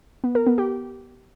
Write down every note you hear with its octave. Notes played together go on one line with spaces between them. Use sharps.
B3
A#4
B3
G4